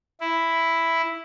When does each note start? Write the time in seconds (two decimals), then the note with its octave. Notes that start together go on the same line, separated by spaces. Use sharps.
0.21 E4